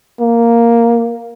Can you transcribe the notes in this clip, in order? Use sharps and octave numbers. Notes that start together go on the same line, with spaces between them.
A#3